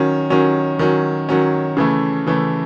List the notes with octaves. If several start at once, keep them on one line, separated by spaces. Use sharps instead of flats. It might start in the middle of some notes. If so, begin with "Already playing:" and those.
Already playing: D#3 F#3 C#4
D#3 F#3 C#4
D#3 F#3 C#4
D#3 F#3 C#4
C#3 E3 A3
C#3 E3 A3